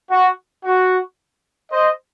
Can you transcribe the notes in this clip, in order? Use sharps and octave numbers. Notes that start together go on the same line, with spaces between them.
F#4
F#4
C5 D#5